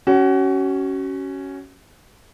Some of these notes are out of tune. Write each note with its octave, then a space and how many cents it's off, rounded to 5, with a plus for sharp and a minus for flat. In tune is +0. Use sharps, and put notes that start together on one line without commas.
C#4 +0 F#4 +30